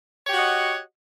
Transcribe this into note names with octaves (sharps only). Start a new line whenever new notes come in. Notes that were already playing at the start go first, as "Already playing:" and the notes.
F#4 G4 C#5 D#5 F#5